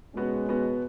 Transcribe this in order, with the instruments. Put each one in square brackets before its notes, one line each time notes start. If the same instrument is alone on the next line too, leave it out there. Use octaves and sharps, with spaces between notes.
[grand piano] B2 B3 F#4 [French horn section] G#3 C#4
[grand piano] B2 B3 F#4